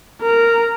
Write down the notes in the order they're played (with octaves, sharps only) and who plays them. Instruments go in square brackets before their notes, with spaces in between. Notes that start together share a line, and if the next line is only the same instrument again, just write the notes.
[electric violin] A#4